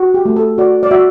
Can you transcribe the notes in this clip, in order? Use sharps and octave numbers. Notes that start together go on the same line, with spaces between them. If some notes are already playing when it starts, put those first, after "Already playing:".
Already playing: F#4
G4
A3
A4
F#4 D5
D5
F#4 E5